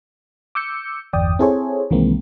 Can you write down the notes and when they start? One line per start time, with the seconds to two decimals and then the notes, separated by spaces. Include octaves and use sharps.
0.55 D6 E6 G6 C#7
1.13 G1 E2 D5 G5 D#6
1.39 C4 E4 G#4 A4 C5 C#5
1.90 C2 D#3 E3 G#3 A#3 C4